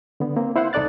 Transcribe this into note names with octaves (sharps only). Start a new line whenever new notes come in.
D3 B3
A#3 C4
E4 C5 F5 F#5 C6
C2 D#4 A4 D5 F#6 A6